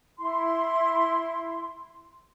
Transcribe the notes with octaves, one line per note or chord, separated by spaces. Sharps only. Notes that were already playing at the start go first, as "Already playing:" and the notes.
E4 C6